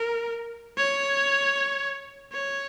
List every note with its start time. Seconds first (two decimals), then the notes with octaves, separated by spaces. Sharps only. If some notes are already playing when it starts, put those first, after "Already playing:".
Already playing: A#4
0.78 C#5
2.32 C#5